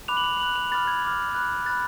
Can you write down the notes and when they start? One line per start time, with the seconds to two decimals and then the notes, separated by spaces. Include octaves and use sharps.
0.08 B5 D6 F#6 F7
0.17 F#7
0.24 F7
0.40 B5 D6 F#6 F#7
0.56 F7
0.71 B5 D6 F6 A6
0.87 G#6
1.03 B5 D6 F6
1.35 B5 F#6
1.65 B5 F#6 A6